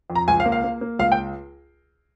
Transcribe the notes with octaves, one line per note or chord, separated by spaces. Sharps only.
F2
A#5
C#2 G#5
F5
A#3
F5
A#3
A#3
C#2 F5
G5